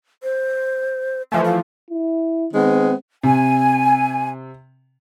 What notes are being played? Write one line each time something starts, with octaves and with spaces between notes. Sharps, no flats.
C5
E3 F3 A3 G#5
F5
E4
D#3 G#3 B3 C4
C3 G#5